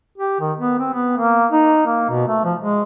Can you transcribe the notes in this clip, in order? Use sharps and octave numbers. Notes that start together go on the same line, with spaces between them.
G4
D#3
B3
C4
B3
A#3
D#4
A#3
B2
A3
F3
G#3